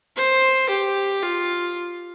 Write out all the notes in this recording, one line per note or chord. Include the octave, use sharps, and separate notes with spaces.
C5
G4
F4